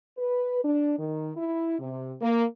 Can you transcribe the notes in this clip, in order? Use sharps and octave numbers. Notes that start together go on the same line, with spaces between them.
B4
D4
D#3
E4
C3
A#3